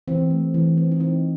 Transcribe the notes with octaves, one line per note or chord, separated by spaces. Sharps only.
E3 C4
A3
E3
C4
D#4
E3 C4